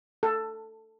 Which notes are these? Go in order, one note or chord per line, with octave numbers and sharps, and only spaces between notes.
A4